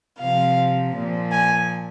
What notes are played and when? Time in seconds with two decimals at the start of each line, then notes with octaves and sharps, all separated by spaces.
0.19 C3 F3 F5
0.95 A#2 F3
1.32 G#5